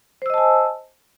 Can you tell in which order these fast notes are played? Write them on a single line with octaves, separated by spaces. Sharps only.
C5 E6 D#5 A5 G#5